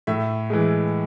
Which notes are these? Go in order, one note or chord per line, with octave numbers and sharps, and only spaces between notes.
A2 E5
E3 G#3